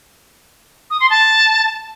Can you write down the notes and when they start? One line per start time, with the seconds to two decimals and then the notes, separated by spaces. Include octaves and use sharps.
0.90 D#6
1.00 C6
1.10 A5